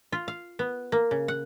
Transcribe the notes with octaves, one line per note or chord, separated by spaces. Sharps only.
F4
F5
B3
A#3
C#3
F#5